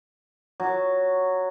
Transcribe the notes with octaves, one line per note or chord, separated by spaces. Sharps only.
F#3